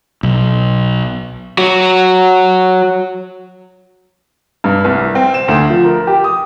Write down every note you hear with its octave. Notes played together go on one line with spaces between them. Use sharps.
B1
F#3 F#4
G2
C2
C4
E7
D2
F3
A#4
G4
D#6